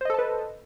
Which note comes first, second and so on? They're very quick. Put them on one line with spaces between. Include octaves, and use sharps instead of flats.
C5 D#5 A4 A5 B4